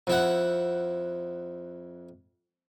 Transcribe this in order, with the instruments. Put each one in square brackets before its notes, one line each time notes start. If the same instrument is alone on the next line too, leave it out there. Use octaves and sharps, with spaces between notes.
[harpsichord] F2 E4 F#5